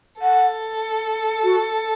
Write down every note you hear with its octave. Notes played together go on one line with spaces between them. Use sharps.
A4 F#5
F#4